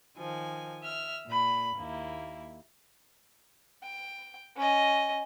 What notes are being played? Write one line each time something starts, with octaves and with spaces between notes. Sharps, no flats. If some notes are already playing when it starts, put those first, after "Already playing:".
D#3 F3 G#5
E5 F6
A#2 B5
D#2 A#3 E4
G5
C#4 D#5